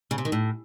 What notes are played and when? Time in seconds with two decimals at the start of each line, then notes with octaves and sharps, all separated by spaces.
0.11 C#3
0.18 C3
0.25 D#3
0.32 A2